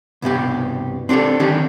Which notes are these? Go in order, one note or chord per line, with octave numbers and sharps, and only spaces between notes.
C2 G2 B2 G4
C4 D4 F4 G4 A4
D3 D#3 C#4 D#4 G4